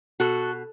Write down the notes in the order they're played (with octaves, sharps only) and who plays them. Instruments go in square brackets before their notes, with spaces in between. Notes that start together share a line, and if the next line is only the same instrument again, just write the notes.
[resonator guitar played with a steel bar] B2 F#4 A4